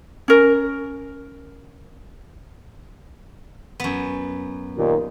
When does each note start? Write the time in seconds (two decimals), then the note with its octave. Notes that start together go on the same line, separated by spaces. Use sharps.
0.28 C#4 A#4
3.80 F#2 B3
4.76 D#2 A#2